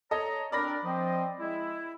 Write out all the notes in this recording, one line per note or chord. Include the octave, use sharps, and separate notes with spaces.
A4 C#5 D#5 A#5
C4 D4 A#4 D5 B5 A#6
F3 C4 D#5
G#3 E4